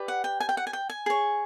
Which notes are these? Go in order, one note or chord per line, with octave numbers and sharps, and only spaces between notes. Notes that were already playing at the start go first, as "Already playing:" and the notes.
Already playing: G4 B4 D5
F#5
G5
G#5
G5
F#5
G#5
G5
G#5
G#4 C#5